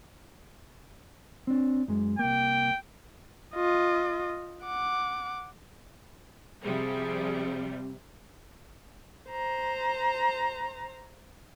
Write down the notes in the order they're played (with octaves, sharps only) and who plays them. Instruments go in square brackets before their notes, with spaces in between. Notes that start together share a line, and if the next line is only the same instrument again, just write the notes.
[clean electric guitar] C4 D4
F#2 G#3
[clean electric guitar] C2 A#3 [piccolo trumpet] G5
[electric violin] F4 D#5
F#5 D6
[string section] C3 F3 G3 [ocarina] C4 [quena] G#4
[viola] C5 A#5